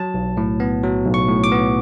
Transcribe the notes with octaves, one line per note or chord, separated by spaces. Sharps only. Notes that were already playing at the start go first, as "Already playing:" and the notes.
Already playing: F#3 A5
B1
A2
B3
F#3
B1
C#6
A2
D6
B3